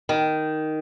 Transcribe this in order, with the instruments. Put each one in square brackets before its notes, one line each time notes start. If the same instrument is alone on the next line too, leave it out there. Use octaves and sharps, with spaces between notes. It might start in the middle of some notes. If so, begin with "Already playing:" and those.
[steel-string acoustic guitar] D#3